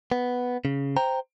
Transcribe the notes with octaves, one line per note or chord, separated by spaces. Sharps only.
B3
C#3
C5 G5 A#5